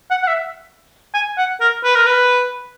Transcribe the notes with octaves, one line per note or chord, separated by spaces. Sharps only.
F#5
F#5
E5
G#5
F#5
A#4
B4
A#4
B4